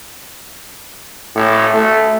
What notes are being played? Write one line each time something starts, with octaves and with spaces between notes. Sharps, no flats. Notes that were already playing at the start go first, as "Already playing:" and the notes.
A2
A3